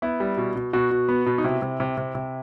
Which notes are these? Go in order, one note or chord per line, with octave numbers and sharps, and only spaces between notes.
B3 E4
G3
B2
B2
B2 F#4
B2
B3
B2
D#4
C3 E4
C3
C3
C3
C3